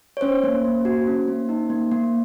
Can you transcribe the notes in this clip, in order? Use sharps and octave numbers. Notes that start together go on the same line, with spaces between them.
C#5
C#4 C5
A#3
A#3
F#4
C#4
A#3
D#4
A#3
A#3